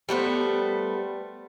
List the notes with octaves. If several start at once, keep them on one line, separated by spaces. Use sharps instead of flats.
G3 A3 B3 C5